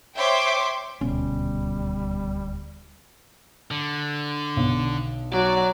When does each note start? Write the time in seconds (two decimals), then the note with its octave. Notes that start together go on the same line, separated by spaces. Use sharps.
0.16 C5 C#5 E5 G5 C6 D6
1.01 D#1 D2 B2 G3 C#4
3.71 D3
4.57 B1
5.33 F#3 D5